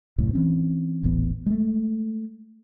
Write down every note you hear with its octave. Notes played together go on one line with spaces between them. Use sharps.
D1 C2 F#2 A2
E3 C4 C#4
D#1 A1 E3 B3
G#3 A3